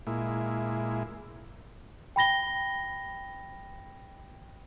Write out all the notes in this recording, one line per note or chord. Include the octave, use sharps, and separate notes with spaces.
A#2 G#3 E4
G5 B5 A#6 G7